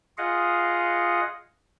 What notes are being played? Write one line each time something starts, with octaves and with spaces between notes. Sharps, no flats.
F4 G#4 D#5 F5 F#5